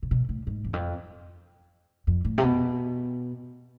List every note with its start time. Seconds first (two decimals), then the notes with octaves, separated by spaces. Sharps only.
0.03 C3
0.11 B2
0.29 A2
0.47 G#2
0.64 E2
0.73 F2
2.07 F2
2.25 A2
2.38 C3
2.43 B2